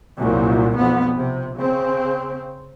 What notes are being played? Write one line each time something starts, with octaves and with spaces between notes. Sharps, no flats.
C2 F#2 A#2
B1 F2 B3
C3
C#3 C4